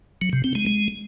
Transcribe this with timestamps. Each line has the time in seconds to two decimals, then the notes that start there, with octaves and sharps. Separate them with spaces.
0.22 F#3
0.33 C3
0.44 C4
0.55 G#3
0.67 G#3